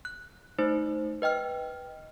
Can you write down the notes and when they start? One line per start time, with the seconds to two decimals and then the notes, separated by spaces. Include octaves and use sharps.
0.05 F#6
0.59 A3 D#4 C5
1.22 B4 D#5 G5 F6